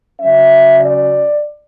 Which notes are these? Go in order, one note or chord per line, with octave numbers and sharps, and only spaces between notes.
C#3 F#3 C#4 E5
D5